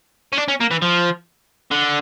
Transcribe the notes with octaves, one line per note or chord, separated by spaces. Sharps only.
C#4
D4
C#4
A#3
E3
F3
D3